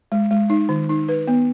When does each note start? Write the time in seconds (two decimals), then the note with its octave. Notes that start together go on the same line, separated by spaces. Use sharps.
0.12 G#3
0.31 G#3
0.50 D#4
0.69 D#3
0.89 D#4
1.09 B4
1.28 B3